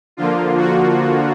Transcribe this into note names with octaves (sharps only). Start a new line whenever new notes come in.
D3 F3 A#3 F4
F#4